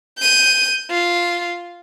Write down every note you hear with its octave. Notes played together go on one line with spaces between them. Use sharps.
G6 D#7
F4